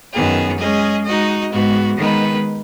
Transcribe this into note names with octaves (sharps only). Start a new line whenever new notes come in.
F#2 D#3 F#3 B3 G#4
G#3 C#4 G#4 D#5
G#3 D#4 F#4 D#5
G#2 G#3 B3 F#4
D#3 G#3 B3 D#4 B4